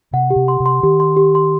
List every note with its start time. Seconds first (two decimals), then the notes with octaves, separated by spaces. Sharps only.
0.13 C3 F#5
0.30 G4
0.36 C3
0.48 C6
0.60 C3
0.66 C6
0.83 D#3 G4
1.00 C6
1.17 G4
1.35 C6